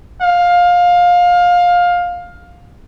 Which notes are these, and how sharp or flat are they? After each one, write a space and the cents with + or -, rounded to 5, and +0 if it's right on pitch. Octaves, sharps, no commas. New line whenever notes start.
F5 +20